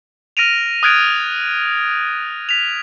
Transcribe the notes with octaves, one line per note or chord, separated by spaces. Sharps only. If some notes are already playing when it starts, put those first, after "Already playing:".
F6 A#6 D7 D#7 F7
D#6 F6 F#6 G#6 A6 D7
B6 F7